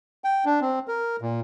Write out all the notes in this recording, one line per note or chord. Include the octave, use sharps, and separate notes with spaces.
G5
D4
C4
A#4
A#2